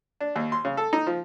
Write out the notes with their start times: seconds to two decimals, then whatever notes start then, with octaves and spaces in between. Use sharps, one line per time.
0.20 D4
0.36 D#2
0.52 C6
0.65 C#3
0.77 A4
0.93 D#4
1.07 F3